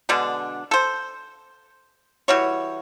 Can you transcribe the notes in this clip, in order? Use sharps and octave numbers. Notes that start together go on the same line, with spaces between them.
B2 D3 G#3 D4
A4 C5
E3 G3 F#4 C#5